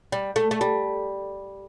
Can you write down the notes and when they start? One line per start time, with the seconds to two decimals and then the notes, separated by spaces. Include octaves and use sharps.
0.12 G3
0.36 A3
0.51 A3
0.61 G3